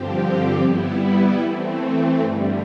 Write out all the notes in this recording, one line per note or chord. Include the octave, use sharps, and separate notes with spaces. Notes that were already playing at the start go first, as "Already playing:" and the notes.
Already playing: G2 D3 F3 C4 G4
G3 B3 E4
E3 A3 C4
G2 D3 G3